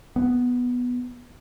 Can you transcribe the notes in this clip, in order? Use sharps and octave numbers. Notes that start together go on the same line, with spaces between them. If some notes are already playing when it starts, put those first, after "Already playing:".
B3